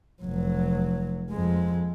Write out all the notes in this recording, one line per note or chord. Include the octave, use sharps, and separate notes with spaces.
F1 F#3
F2 G#3